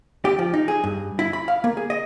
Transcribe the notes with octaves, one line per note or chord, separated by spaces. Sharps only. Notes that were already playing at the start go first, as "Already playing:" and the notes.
G4
F3
D#4
G#4
G2
E4
B5
F5
A#3
G#4
D#5